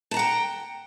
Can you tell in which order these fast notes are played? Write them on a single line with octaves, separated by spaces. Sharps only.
A5 A#5 F#5 G5